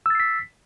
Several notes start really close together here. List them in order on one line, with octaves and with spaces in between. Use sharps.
E6 A6 C7 B6